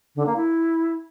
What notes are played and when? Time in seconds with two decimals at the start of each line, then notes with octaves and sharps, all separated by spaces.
0.15 D3
0.26 A#3
0.36 E4